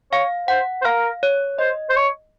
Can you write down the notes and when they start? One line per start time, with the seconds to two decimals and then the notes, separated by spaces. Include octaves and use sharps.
0.12 C#5 F5
0.48 C5 F#5
0.81 C5
0.85 A#4 F5
1.23 C#5
1.59 C5 D#5
1.90 C5
1.96 C#5